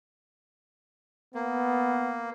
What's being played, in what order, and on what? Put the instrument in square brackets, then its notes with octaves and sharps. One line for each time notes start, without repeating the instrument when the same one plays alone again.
[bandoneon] A#3 [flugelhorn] B3